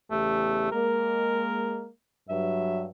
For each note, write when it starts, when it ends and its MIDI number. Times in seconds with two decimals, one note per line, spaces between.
0.11 0.72 40
0.11 0.72 49
0.11 0.69 57
0.11 0.72 67
0.72 1.87 56
0.72 1.87 58
0.72 1.88 70
2.29 2.88 43
2.29 2.88 54
2.29 2.85 76